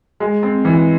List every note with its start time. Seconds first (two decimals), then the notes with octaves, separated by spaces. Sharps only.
0.20 G#3
0.43 C4
0.65 E3